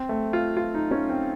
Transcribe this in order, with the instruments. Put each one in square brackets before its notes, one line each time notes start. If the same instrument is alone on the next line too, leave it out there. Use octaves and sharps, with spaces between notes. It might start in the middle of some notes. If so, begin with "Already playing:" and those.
Already playing: [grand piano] C4
A3
F4
F4
D#4
C#4
C4